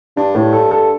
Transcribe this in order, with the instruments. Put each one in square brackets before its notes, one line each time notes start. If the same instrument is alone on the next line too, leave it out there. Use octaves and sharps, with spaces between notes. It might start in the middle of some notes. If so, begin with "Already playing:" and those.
[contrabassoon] G2 [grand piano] D4
[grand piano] A2
A4
A4